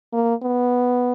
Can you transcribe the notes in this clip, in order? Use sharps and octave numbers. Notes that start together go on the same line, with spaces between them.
A#3
B3